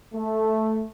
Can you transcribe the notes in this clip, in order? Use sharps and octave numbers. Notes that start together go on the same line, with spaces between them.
A3